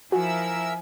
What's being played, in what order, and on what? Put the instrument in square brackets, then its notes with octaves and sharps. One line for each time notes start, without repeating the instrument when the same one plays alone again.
[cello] F3 E4 [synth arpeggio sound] F#4 [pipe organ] A#4 E5 E6 [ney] G#5